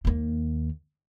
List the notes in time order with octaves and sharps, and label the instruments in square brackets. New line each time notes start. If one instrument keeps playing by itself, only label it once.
[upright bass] D#2 A#3